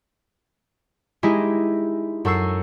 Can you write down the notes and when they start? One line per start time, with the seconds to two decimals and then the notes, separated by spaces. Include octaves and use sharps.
1.23 G#3 D#4 E4 G4 G#4
2.25 F#2 A4 C#6 E6 C7